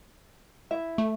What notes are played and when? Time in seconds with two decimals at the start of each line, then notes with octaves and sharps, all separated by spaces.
0.71 E4 E5
0.98 A3